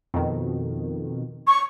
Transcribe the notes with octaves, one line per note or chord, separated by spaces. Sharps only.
F2 B2 D#3
C#6